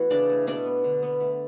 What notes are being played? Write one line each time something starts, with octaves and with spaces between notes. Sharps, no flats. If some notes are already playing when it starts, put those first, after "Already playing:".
Already playing: E3 A3 B3 F#4 F#5
C#3 D4 D5
A3
B2 D4 D5
B3
D3
B3
A3